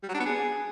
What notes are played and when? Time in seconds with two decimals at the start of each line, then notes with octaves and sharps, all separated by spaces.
0.03 G3
0.09 F#3
0.14 D4
0.20 B3
0.26 G#4